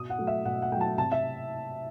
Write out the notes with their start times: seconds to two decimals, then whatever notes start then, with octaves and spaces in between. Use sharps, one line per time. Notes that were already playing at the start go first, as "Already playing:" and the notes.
Already playing: B2 D#6
0.10 F#5
0.19 F#3 A3
0.27 E5
0.45 B2 F#5
0.62 F#5
0.72 A3 G5
0.76 F#3 A5
0.98 C3 A5
1.12 E5